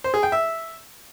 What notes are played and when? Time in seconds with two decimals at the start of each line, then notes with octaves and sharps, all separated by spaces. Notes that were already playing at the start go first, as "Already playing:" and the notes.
0.04 C5
0.14 G#4
0.23 G5
0.32 E5